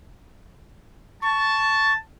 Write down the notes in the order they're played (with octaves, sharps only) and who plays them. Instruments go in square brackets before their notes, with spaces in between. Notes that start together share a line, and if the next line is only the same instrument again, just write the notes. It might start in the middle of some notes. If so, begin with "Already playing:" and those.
[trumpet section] A5 [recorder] C#6